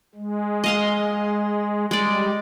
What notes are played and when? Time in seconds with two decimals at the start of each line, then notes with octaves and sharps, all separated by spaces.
0.15 G#3
0.64 D#5 F5 C6
1.91 G3 G#3 D5